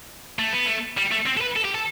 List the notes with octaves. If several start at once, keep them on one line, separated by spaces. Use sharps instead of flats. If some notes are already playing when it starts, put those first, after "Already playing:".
A3
B3
A3
G3
A3
C4
A4
B4
A4
G4
A4